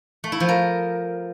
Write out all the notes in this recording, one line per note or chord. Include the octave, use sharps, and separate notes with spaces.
A3
E4
F3
A#4